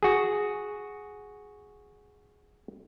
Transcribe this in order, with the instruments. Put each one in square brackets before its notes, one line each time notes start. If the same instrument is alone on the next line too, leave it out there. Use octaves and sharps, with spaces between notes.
[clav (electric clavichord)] F#4 G#4